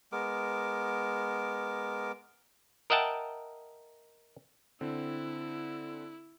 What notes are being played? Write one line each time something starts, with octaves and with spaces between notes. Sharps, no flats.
G#3 B3 A#4 D6
A#4 D#5 E5 F#5 G5 A5
D3 C4 E4